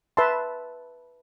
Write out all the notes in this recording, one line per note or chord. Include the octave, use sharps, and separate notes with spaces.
B4 E5 A5 C6